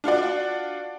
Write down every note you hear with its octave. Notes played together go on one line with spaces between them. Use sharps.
D4 F4 F#4 D5